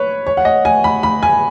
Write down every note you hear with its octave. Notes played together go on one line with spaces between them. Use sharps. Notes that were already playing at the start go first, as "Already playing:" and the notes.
Already playing: B4 C#5
C#5
F#5
D#5
G#5
B5
B5
G#5